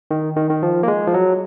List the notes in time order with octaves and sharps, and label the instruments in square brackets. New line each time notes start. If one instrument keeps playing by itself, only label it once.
[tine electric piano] D#3
D#3
D#3
F3
A#3
G#3
F3
F#3